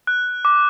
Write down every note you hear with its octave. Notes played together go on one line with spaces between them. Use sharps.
F#6
D6